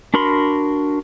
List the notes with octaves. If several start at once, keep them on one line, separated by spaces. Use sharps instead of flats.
D4 F#4 A#4 B5 C6